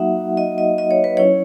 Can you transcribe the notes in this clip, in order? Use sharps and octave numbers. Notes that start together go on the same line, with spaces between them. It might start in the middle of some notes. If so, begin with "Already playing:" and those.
Already playing: F#3 A#3 D#4 F#4 E5 F#5
D#5
D#5
D#5
C#5
B4
F#3 C#4 E4 C#5